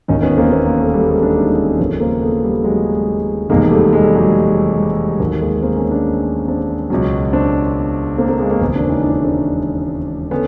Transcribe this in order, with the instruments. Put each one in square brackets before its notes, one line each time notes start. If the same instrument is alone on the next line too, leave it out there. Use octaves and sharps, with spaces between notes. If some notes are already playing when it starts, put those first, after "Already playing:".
[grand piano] E1 D#2 D#3 C#4 D#4
B3 C#4
A#3 C4
A#3 C4
A#3 C4
A3 B3
G3 A3
G#3 A#3
C4 D4
C#4 D#4
D#2 C#3 F3 B3 C#4
A#3 C4
A3 B3
G3
F#3 G#3
F1 E2 C3 D#3 G#3 A#3
G3 A3
G#3
G3
F#3 G#3
G3
D#2 D#3 F#3
G#3 A#3
A#3 C4
B3 C#4
C4 D4
C4 D4
C#2 B2 F#3
C4 D4
A#3 C4
A#3 C4
G#3 A#3
A#3 C4
E1 D#2 C#3 B3 C#4
C4 D4
C#4 D#4
D4 E4
C4 D4
D3 B3 C#4